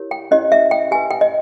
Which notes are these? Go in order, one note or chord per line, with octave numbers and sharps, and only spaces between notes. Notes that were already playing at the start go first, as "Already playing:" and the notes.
Already playing: E4 G4 A#4 C#5
G5
C#4 E4 G4 C#5 D#5
E5
G5
G4 B4 G#5
G5
D#5